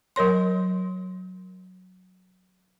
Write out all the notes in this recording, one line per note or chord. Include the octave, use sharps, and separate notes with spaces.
F#3 A#4 C#5 C6